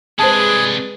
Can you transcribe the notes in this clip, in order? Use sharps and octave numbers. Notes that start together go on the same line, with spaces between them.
C3 G#3 D4 G#4 B4 C5 G#5 A5